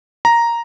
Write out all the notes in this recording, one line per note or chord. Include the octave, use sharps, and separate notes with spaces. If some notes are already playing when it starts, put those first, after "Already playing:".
A#5